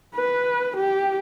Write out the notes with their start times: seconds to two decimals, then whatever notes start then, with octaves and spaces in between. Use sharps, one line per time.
0.16 B4
0.77 G4